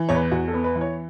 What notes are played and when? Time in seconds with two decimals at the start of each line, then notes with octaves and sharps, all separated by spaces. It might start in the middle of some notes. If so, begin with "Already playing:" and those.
Already playing: E3
0.09 E2 C#5
0.15 B4
0.32 E2 F#4
0.48 A4
0.53 B3
0.64 B4
0.75 E3
0.81 C#5